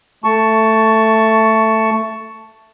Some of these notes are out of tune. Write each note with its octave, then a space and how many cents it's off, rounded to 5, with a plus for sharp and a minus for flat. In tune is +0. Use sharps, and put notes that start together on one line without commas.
A3 +10 A5 +0 C#6 +10